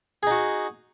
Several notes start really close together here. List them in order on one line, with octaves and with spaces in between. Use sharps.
G#4 D#4 F#4